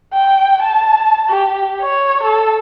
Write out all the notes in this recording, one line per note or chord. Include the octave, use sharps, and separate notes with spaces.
G5
A5
G4
C#5
A4